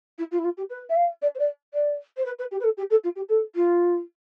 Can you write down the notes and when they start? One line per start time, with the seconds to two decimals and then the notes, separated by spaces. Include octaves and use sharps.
0.18 E4
0.31 F4
0.38 E4
0.44 F4
0.57 G4
0.70 B4
0.89 E5
0.96 F5
1.22 D5
1.35 C5
1.39 D5
1.74 D5
2.17 C5
2.25 B4
2.39 B4
2.51 G4
2.60 B4
2.64 A4
2.77 G4
2.90 A4
3.04 F4
3.16 G4
3.29 A4
3.55 F4